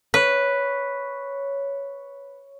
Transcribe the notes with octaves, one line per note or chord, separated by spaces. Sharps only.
B4 C#5